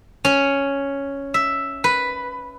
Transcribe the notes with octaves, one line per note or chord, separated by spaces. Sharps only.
C#4
E5
B4